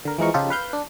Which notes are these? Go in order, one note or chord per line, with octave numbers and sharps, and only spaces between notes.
D3 A#4
E3 F3 G#3 D#4 A#4 C#6
C#3 F3 D#4 F4 G4 A4
B4 F5 G6
D4